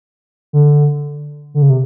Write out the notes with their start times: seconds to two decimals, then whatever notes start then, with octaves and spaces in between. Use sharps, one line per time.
0.53 D3
1.54 D3
1.62 C#3
1.70 C3